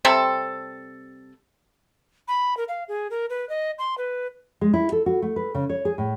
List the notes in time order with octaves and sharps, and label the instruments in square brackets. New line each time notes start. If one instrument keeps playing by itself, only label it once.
[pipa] C3 G3 C4 A4
[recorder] B5
A#4
F5
G#4
A#4
B4
D#5
C6
B4
[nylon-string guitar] G#3
E4
A4
F#4
A3
B4
C#3
C#5
G#4
A2